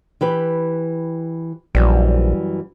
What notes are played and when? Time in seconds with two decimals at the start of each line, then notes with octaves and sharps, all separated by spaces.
0.21 E3 G4 B4
1.75 A#1 F#2 E3 G3